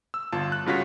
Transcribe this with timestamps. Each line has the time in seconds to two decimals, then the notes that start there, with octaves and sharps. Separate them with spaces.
0.14 E6
0.32 G1 F4 A5
0.52 F#6
0.66 G2 C#3 F4 F#4 C#5 B6